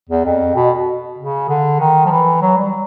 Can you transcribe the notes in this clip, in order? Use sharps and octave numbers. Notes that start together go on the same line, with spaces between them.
E2
F2
B2
C#3
D3
D#3
F3
E3
F#3
G3